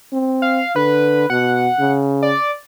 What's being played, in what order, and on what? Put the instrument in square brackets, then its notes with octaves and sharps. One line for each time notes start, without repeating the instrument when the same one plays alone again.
[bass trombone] C4
[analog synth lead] F5
[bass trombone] D3 [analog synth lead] B4
[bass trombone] B2 [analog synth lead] F#5
[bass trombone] C#3
[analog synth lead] D5